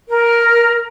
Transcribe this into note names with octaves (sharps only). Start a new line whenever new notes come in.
A#4